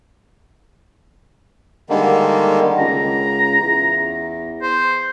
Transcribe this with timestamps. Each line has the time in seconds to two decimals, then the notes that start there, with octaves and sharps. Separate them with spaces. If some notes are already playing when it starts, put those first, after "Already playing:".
1.90 D3 D#3 G3 G#3 A#3
2.79 C#2 A#5
3.60 E2
4.63 C5